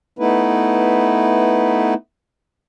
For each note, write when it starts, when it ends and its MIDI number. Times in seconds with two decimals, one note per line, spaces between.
0.19 1.94 57
0.19 1.94 59
0.19 1.94 63
0.19 1.94 64
0.19 1.94 71